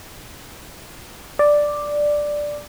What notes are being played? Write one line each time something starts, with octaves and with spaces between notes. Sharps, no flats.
D5